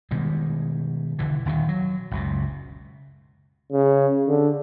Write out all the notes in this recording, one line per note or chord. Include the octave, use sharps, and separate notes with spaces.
B2 D#3 G3 G#3
E1 D3 E3
D#1 D#2 D#3
F#3
F#1 C#2 B2
C#3
D3